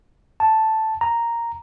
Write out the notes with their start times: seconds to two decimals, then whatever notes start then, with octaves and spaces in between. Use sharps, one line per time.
0.40 A5
1.01 A#5